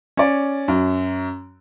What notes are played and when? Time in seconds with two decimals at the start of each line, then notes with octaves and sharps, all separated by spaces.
0.17 C#4 D5
0.68 F#2